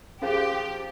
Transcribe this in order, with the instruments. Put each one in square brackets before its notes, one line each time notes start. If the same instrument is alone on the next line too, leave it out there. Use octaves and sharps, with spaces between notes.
[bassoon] F3 [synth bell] C#4 G#4 [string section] G4